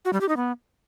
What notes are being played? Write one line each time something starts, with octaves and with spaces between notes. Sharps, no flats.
F#4
G3
G4
D#4
B3